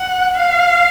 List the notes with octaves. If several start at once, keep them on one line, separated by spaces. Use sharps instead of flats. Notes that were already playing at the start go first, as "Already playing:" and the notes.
Already playing: F#5
F5